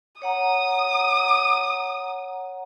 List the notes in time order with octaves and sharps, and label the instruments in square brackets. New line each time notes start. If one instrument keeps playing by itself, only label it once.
[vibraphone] C#5 F#5 A#5 [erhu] D#6